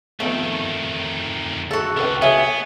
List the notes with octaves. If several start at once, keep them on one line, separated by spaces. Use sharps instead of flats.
F2 D#3 A3 B3 C4 F4
A3 F#4 G#4 A4
C#2 D4 B4 G5
B3 F#4 G#4 C#5 E5